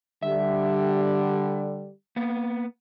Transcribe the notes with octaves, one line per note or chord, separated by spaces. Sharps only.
D3 G3 E5
A#3 B3